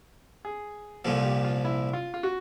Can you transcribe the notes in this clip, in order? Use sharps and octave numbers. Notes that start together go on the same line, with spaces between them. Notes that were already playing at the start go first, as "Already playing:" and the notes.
G#4
C2 A#2 F3 A4
G4
F4
E4
F4
F4
F#4